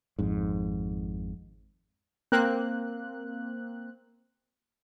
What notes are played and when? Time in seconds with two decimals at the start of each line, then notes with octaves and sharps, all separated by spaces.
0.19 G#1 F2 G#2
2.32 A#3 C4 F#6